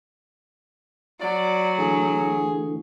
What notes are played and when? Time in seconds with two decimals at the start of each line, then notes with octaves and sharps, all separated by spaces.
1.21 F#3 D5
1.78 D3 E3 A3 G#4